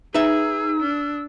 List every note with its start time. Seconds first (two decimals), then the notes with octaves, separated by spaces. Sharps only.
0.14 D#4 G#4 B4 E5 E6
0.81 D4